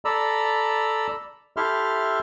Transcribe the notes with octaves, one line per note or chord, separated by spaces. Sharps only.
A4 D5 A#5 B5 E6
E4 G4 A4 E5 C6 F6